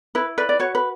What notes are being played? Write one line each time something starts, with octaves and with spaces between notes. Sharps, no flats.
E4 B4
B4 D5
D5
F#4 C#5
B4